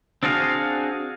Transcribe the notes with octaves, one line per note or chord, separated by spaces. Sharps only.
C4 D4 F#4 G#4 F5